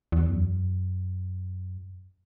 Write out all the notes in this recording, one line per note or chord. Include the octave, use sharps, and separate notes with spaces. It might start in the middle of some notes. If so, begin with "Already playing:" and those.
E2
F#2